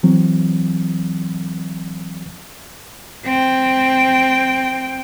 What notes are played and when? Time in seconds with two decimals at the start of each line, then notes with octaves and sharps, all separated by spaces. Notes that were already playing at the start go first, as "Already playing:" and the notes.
0.03 E3 F#3 C4
3.25 C4 G5